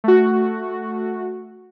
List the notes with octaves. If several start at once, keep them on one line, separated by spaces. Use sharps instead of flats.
A3 F#4